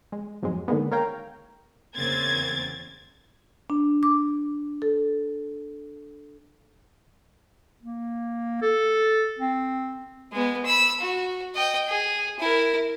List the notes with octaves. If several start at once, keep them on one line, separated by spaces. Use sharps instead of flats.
G#3
F2 G#2 F#3 G#3
D3 D#3 G#3 A#3 B3
A#4 C#5 F5 G5 A#5
E2 C#3 A#3 C4 G#6 A6
D4
D6
A4
A#3
A4
C4
G#3 B3
B5 E6
F#4
D#5 G5
G#4
E4 A#4